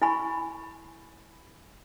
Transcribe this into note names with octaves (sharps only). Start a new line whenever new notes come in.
E4 G#5 B5 C#6